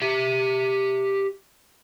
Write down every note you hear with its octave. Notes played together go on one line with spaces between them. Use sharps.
G4 E5